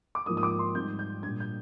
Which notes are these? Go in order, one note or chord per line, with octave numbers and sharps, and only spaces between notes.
D6
G#2 F3 A#3 D#4 D#6
D#6
D6
C6
G#2 G3 C4 D#4 G6
G6
A#2 G3 D4 G#6
G6